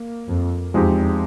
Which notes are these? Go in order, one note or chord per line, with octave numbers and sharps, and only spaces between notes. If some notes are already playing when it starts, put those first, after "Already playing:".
Already playing: A#3
F2
E2 F3 G#3 C4 D#4 G4